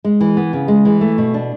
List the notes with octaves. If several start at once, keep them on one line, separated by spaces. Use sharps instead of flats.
G#3
E3
B3
C#3
G#3
E3
A3
B2
D4